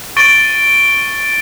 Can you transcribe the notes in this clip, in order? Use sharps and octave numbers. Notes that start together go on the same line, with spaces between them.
C#6 A6 D7 G7